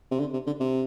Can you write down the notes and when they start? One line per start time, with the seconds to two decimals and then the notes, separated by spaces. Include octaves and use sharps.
0.11 C3
0.20 D3
0.33 C3
0.47 D3
0.60 C3